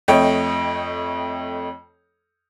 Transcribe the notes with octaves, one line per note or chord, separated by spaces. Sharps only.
F2 A3 C#5 D#5 G5